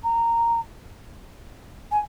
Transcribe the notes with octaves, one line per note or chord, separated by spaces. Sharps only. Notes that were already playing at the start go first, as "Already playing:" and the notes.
A#5
G#5